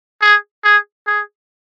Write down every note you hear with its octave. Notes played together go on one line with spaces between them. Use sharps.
G#4
G#4
G#4